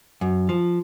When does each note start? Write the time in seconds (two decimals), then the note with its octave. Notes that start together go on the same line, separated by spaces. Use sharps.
0.21 F#2
0.49 F3